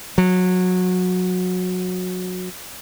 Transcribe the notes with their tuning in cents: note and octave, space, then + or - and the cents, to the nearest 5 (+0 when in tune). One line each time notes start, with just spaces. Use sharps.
F#3 -20